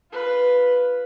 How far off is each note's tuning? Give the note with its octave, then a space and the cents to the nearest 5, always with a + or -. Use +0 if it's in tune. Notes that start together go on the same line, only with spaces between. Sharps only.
F4 +0 B4 +0